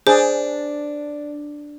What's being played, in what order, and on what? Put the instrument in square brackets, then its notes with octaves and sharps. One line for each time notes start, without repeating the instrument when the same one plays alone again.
[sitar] D4 [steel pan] G#4 [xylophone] C5